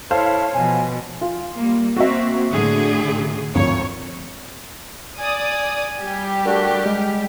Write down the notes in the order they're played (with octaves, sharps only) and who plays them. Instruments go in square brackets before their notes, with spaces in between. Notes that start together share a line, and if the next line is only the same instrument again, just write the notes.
[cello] E4 C#5 [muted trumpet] A4 [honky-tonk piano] C5 F5
[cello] B2 F3 [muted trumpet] G#5
[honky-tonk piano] F4
[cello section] G3 A#3
[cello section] A#3 C4 [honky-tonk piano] F#4 E5
[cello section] A2 D3 G#4
[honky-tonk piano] G#1 D2 F3 [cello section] C#5
[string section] D5 D#6 [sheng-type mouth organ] G#5
[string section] G3 G4
[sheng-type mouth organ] A3 D4 F#4 [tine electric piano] A#4
[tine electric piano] G#3 [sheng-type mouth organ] F6